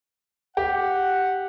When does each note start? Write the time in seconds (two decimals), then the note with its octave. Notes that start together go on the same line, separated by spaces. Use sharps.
0.57 G4 F#5